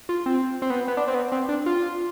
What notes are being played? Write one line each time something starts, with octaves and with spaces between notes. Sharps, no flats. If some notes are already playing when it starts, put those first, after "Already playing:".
F4
C4
C4
B3
B3
D4
C4
B3
C4
D4
F4